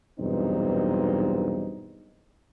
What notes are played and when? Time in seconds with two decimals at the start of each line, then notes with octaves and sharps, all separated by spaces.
0.19 B1 E2 G2 A#2 C4 D#4